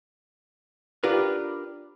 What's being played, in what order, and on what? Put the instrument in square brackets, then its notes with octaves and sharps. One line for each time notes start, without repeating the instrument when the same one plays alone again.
[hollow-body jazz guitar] D4 F4 G4 A#4 B4